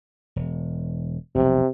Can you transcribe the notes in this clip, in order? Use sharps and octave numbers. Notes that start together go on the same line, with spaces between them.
E1
F1 B1 C3